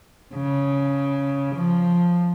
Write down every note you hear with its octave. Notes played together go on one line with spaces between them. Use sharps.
C#3
F3